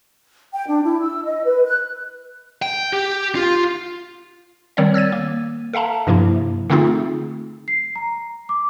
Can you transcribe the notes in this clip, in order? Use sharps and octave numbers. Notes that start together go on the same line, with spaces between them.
G5
D4
E4
E6
D#5
B4
F#6
G5
G4
F4
D#3 G3 C4 C#5 D5
E6 G#6 A6 D#7
A#3
A4 E5 F5 A5 A#5
G2 C3 F3 A#3 E4
D3 A3 C4 D#4 F4 G#4
C7
A#5
D6